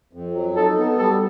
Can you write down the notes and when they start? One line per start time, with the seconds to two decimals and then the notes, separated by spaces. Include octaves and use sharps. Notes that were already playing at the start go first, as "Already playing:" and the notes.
0.13 F2
0.34 F#3
0.56 D#4 A4
0.77 B3
0.98 G3 A4